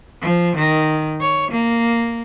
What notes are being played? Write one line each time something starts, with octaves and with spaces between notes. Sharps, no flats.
F3
D#3
C#5
A#3